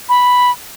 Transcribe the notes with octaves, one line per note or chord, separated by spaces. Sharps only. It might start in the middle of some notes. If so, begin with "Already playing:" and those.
B5